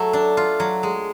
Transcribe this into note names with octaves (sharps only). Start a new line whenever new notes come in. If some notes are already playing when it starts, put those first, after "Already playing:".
Already playing: F#3 A3
D4
F4
F#3
G#3